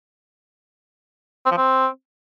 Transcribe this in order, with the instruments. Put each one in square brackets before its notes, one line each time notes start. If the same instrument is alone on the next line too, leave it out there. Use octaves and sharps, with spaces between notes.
[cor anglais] C4
F3
C4